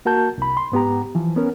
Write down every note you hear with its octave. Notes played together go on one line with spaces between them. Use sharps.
A#3 F#4 A#4 A5 G6
C2 B5
C6
G#2 B3 G4 A#5
E3 F3
B3 C#4 A#4